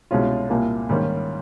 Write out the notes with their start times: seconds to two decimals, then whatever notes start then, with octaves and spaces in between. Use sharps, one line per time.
0.11 C2 B2 G#3 C#4 F4
0.50 C2 A#2 G3 A#3
0.89 G#2 D#3 G3 A#3 C#4